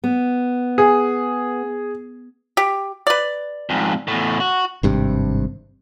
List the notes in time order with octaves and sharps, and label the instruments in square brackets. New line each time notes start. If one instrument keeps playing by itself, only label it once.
[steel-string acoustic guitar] B3
[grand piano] G#4
[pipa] G4
B4 D5
[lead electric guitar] F2 G#2
E2 A2
F#4
[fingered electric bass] G#1 G2 C3